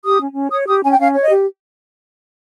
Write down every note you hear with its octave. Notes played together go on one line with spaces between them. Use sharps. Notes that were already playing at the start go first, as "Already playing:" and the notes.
G4 D#6
C#4
C#4
C#5 D#6
G4 D#6
C#4 G#5
G5
C#4 F5
C#5
D#5
G4